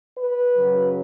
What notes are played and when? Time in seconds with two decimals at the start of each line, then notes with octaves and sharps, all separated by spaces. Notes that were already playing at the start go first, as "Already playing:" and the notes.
0.17 B4
0.56 F#2 C#3 F#3